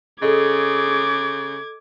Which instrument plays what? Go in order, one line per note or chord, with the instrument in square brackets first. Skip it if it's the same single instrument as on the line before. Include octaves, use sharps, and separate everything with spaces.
[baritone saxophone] C#3 [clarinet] G#4 [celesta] A4 D#5 [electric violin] D6 G#6